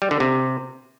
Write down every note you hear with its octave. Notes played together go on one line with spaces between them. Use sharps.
G3
D3
C3